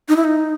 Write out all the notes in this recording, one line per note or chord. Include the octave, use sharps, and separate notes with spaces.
D#4
E4
D#4